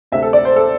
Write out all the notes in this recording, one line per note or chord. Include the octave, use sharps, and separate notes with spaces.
D2 C3 A3 E5
A4
D5
C5
A4